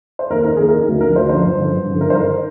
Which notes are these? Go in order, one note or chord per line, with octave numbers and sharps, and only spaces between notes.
C5
D#2 A#4
D#3 A#4
D#2 G#4
D#3 A#4
D2 A#4
D3 F3 A#4
D2 C5
D3 F3 C5
G2
D3 F3
G2
D3 F3
G2 A#4
C5
D#3 A#4